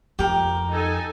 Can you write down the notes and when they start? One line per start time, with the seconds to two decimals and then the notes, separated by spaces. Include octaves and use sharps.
0.19 F2 G4 A#4
0.69 D#4 A4 G#5